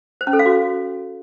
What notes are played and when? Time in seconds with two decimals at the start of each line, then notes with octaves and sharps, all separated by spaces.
0.21 C5
0.27 C#4
0.33 A4
0.39 F5
0.46 F#4